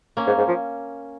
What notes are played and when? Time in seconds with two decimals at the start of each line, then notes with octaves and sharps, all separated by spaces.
0.17 A#3 C#4
0.27 G#2
0.38 G#2
0.48 F3